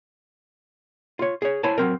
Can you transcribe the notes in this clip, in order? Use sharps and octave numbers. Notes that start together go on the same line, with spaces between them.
F4 C#5
G#4 C#5
E4 C5 C#5 G#5 A5
F#3 C4 A#4